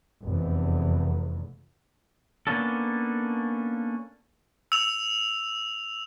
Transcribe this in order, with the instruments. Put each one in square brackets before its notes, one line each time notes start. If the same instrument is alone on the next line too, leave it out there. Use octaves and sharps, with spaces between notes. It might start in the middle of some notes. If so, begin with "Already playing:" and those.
[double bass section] F1 E2
[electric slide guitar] A#3 B3 C#4 D4 A4
[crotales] E6 F7